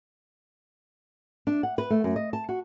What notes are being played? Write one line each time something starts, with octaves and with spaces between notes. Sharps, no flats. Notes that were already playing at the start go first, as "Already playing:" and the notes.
D4
F#5
B4
A3
F#2
D#5
A5
F#4